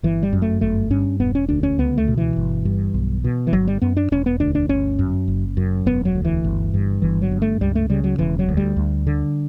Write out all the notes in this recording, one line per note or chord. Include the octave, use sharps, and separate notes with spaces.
G1 E3
G3
F#2
A3
G1 A3
G2 C#4
E1 B3
C#4
D2 D4
C#4
C#2 B3
A3
B2
E3
G1
G2
B1
B2
E3
G1 F#3
G3
F#2 B3
D4
E1 C#4
B3
D2 D4
D4
G1 C#4
F#2
F#1
F#2
E1 B3
F#3
D2
E3
G1
G2
G1 E3
F#3
G2
A3
C#2 G3
A3
C#3 G3
F#3
E1 E3
F#3
D2
G3
D2
D3